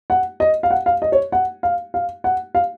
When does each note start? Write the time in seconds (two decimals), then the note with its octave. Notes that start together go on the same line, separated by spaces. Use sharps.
0.10 F#5
0.40 D#5
0.63 F5
0.71 F#5
0.86 F5
1.02 D#5
1.12 C#5
1.32 F#5
1.63 F5
1.94 F5
2.24 F#5
2.55 F5